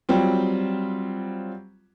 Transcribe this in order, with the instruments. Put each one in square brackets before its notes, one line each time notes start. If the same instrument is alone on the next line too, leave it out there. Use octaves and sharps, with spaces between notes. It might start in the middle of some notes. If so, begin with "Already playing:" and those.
[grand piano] F#3 G3 C4 F4